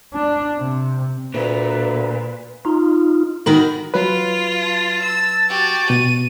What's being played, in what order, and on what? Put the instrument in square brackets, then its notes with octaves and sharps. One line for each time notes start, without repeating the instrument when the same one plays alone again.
[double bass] D4
C3
[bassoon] D2 [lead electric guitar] A#2 [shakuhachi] B4
[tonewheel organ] D#4 F4
[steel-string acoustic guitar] D#3 F#4 A#4 [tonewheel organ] B5
[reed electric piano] F#3 B4 [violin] F4
[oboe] A5
[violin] E6
F#4 G4
[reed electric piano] B2 [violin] D#7